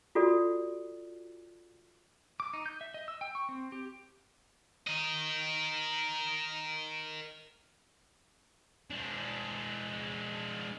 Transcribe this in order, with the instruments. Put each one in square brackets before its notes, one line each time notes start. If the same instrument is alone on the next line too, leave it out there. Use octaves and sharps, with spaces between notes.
[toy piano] F4 F#4 A4 D5
[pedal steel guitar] D6
D#4
G6
E5
D#5
E6
G5
C#6
C4
G4
[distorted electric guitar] A#4 D#5
G#3 D4